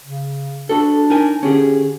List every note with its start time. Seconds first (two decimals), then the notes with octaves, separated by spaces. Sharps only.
0.02 C#3
0.69 D4 F#4 A4
1.10 D#4 A#4 G#5
1.43 D3 C#4 G4 G#4